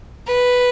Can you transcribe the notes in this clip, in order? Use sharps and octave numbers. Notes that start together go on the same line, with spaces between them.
B4